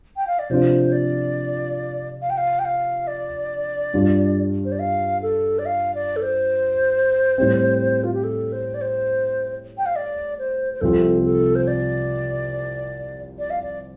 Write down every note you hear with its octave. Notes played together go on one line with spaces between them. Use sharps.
G5
F5
D5
C3 F3 D4 F4 C5
D5
F5
G5
F5
G5
F5
D5
G2 G3 D4 F4
C5
D5
F5
A4
D5
F5
D5
A4
C5
A2 G3 C4
F4
G4
A4
C5
D5
C5
G5
F5
D5
C5
C5
C2 C3 F3 C4 A4
A4
C5
D5
D5
F5
D5